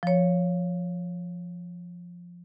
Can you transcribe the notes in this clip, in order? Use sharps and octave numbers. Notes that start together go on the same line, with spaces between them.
F3 C#5